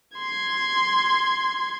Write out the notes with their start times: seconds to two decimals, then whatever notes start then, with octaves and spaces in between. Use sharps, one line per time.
0.18 C6 G#6